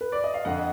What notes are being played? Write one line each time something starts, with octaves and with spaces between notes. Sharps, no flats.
B4
D5
D#5
F5
F2 D3 D#5 F#5